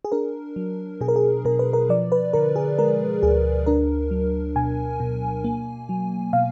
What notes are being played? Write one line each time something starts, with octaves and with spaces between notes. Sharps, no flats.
G#4
D4 A#4
F#3
B2 G#4
A#4
G#4
B2 A#4
B4
A#4
F3 D5
B4
D3 A#4
G#4
G#3 A#4
D2 G#4
D4 A#4
F#3
B2 G#5
B2
A#3
F#3
B2 F5